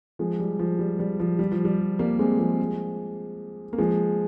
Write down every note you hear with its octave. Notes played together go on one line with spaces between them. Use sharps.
F3 G#3
G3
F3
G3
G3
F3
G3
F3
G3
G3 A#3
G#3 C4
F3 G#3
A#3
F3 G#3